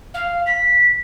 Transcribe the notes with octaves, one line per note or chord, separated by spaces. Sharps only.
F5
B6